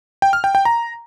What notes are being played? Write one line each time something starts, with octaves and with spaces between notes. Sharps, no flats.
G5
F6
G5
G5
A#5